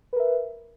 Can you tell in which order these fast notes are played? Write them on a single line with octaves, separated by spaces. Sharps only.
B4 A#4 E5